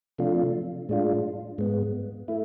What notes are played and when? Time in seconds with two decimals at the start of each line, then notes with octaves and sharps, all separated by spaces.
0.18 C3 F3 A3 D4 F4
0.89 A2 G#3 D4 F4
1.58 G#2 G#3 B3
2.28 A3 E4